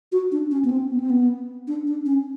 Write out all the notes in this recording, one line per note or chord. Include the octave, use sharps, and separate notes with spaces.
F#4
D4
C#4
B3
C4
B3
C4
B3
D4
D4
C#4